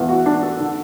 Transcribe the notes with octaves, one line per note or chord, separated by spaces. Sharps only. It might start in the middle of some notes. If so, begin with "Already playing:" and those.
Already playing: E2
F#4
D4
A4
D3